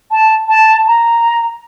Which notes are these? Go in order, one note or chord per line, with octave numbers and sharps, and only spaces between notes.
A5
A5
A#5